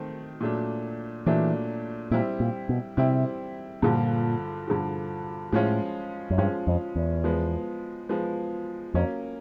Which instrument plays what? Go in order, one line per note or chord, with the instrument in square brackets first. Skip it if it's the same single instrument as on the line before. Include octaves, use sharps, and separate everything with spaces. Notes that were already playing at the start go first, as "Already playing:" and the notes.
Already playing: [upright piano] D#3 A3 C4
A#2 F#3 A3 D4
[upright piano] A#2 F#3 A3 D4 [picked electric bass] E3
[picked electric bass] A#2 [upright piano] G3 C4 E4
[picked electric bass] A#2
B2
[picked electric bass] C3 [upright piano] G3 C4 E4
[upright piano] G2 D3 F3 [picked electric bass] A#2
[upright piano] G2 D3 F3
[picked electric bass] A2 [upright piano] F3 G#3 C#4 F4
[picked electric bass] F#2
[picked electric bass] G2 [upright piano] F3 G#3 C#4 F4
[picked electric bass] F2
E2
[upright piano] F3 G#3 B3
F3 G#3 B3
[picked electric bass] F2 [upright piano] F#3 A#3 C#4